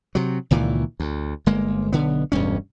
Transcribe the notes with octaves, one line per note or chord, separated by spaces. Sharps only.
C3 F#3
C#2 A#2 D#3 E3
D2
G1 G#3 A#3
B1 D3 B3
E1 D2 G2 C#4